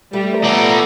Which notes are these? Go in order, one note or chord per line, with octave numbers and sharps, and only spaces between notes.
G3 A3
F3 B3 A4 D5 A#5 E6